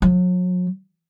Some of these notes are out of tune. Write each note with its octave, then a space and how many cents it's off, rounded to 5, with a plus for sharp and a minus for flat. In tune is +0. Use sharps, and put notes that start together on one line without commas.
F#3 -35